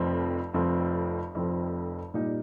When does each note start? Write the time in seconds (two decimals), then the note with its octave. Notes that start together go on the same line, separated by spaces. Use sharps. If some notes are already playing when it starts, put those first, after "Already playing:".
Already playing: F1 F2 F3 C4
0.54 F1 F2 F3 C4
1.34 F1 F2 F3 C4
2.14 A#2 G3 D#4